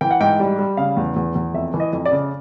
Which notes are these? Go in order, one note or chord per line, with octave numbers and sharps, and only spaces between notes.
E3 G5
F#5
G#2 G5
G3
G3
C#3 F5
E2
E2
E2
F2 E5
E3
D#5
F2
D5
C#3